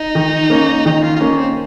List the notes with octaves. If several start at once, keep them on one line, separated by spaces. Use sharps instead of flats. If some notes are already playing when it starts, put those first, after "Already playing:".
Already playing: D#4
D#3
A#3 C#4
D#3 D#4
F4
F4
A#3 C#4 D#4
C4